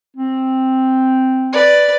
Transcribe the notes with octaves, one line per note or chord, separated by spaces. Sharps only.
C4
B4 D5